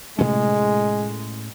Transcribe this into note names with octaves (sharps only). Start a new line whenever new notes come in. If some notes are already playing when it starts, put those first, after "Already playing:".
A2 C3 G#3 A3 C#4